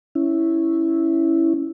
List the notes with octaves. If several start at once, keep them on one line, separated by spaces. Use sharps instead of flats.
C#4 E4